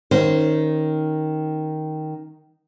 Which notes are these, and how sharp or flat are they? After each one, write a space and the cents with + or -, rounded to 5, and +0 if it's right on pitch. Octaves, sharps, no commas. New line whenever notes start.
D#3 +0 C#4 -5 C5 -20